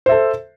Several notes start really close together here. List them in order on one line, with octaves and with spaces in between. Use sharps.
C5 E5 A4